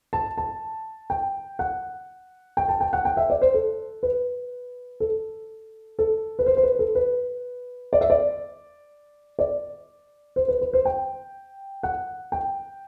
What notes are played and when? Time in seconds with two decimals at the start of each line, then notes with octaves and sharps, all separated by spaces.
0.13 A5
0.38 A5
1.10 G5
1.59 F#5
2.57 G5
2.69 A5
2.81 G5
2.93 F#5
3.05 G5
3.17 E5
3.30 D5
3.42 C5
3.54 A4
4.03 B4
5.00 A4
5.99 A4
6.39 B4
6.46 C5
6.57 C5
6.63 B4
6.79 A4
6.95 B4
7.93 D5
8.01 E5
8.10 D5
9.39 D5
10.36 C5
10.48 B4
10.61 B4
10.73 C5
10.85 G5
11.83 F#5
12.32 G5